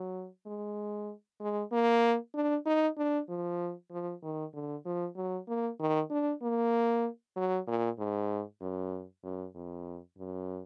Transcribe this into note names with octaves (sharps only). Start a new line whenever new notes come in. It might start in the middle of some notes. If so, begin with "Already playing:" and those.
Already playing: F#3
G#3
G#3
A#3
D4
D#4
D4
F3
F3
D#3
D3
F3
F#3
A#3
D#3
D4
A#3
F#3
A#2
G#2
F#2
F#2
F2
F#2